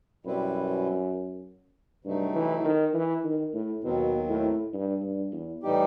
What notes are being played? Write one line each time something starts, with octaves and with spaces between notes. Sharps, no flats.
F#2 B2 G3 C4 E4 B4
G2 C3 F#3 A3 D#4
E3
D#3
E3
D#3
A2
D#2 B2 D#3 F#3 C4
A2
G2
G2
E2
A2 E3 G3 D#4 G4